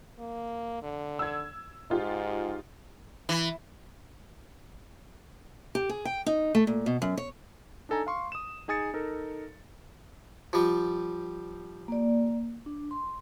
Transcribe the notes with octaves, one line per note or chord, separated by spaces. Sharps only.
A#3
D3
E6 G#6
G#2 D#4 F4 G4
E3
G4
G#4
G5
D#4
A3
A#2
B2
F#2
C#5
D4 D#4 A4 G#5 A#5
F5 C6 C#6
D#6 E7
D#4 G#4 G#5 D#6 A6 C#7
D#4 A4 A#4
F3 G3
A#3 D5
D4
C6